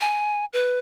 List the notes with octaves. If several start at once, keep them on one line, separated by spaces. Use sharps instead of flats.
G#5
B4